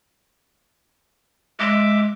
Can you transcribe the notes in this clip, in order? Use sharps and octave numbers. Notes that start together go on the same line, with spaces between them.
G#3 E5 D6